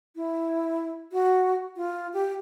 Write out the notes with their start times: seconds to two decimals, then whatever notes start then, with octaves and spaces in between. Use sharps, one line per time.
0.16 E4
1.12 F#4
1.76 F4
2.14 G4